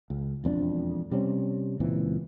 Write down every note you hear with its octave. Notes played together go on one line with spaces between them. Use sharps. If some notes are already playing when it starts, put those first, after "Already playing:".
C#2
E1 F2 C4 D4
C3 G3 C4 C#4
C#2 A#2 E3 C4